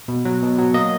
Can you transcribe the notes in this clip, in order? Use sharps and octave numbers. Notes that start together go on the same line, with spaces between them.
B2
F#3
B2
F#3
A#3 D#5